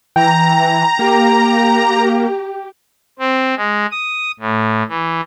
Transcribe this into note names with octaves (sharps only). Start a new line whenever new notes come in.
E3 G5 A#5
A#3 G4
C4
G#3
D#6
A2
E3